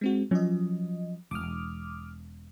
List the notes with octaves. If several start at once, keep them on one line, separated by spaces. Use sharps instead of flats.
G#3 C4 F#4
F3 F#3 C#4 D#5
E1 D6 D#6 F6